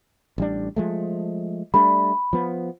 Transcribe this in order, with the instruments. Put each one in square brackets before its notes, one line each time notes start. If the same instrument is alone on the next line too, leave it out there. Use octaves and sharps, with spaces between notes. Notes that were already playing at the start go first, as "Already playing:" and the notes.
[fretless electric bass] A1 G3 D4
F3 G#3 A3
[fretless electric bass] G3 A3 D4 [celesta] B5
[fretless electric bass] F3 B3